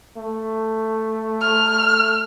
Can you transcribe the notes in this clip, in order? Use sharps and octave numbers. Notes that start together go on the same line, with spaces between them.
A3
F6